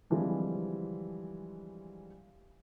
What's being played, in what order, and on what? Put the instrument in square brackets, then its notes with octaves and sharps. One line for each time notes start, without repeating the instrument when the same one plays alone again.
[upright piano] D3 E3 F3 G3 G#3 C4